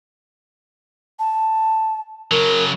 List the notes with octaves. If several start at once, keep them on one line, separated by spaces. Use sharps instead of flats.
A5
C#3 F#3 A#4